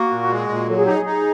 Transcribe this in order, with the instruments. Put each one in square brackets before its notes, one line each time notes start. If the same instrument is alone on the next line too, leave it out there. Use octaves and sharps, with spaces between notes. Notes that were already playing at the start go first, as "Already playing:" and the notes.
Already playing: [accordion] A#3 [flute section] F#4
[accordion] A#2
G#3
A#2
[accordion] F#3 [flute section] A4
[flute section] G#4
G4
[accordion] D#4
[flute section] G#4
[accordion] D#4